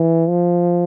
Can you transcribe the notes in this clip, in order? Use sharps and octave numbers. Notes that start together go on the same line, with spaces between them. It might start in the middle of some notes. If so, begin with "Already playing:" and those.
Already playing: E3
F3